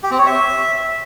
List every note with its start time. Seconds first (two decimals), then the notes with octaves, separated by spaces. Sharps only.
0.03 G4
0.11 C4
0.19 C#5
0.26 E5